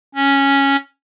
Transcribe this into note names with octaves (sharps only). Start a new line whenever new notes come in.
C#4